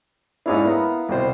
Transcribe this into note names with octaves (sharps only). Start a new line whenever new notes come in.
G#2 C#4 D4 E4 F5 D#6
B3 A#4
C2 B2 C5